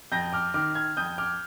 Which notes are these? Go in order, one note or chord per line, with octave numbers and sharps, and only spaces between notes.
F2 G6 A#6
D6 F6
D#3 D6 F6
F6 G#6
F2 D#6 G6
D6 F6